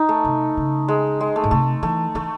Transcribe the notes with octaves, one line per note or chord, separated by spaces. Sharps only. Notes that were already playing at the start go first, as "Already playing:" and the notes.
Already playing: D#4
A3
C3
C#3
G#3
G#3
A3
A2
C3 A3
E3 A3
E3 A3